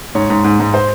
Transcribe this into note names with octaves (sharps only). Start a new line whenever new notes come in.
G#2 C#5
G#2
G#2
G#2
C5